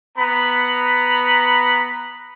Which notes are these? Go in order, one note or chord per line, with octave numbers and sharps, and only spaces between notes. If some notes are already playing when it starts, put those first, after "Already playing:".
B3 A#5 B5